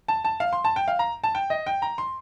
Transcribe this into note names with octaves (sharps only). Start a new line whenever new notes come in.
A5
A5
F5
C6
A5
G5
F5
A#5
A5
G5
D#5
G5
A#5
C6